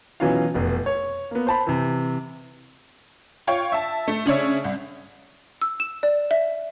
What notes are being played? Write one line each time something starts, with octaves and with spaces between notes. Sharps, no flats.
B2 E3 F#3 C#4 F4 F5
F1 B2
C#5
A#3 B3
C5 A5 B5
C3 E3
F4 C#5 G5 C#6
E5 A5
A3
C#3 D4 C#5 E5
C2
E6
E7
D5
E5